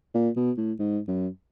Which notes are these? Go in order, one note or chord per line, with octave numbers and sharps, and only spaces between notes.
A#2
B2
A2
G#2
F#2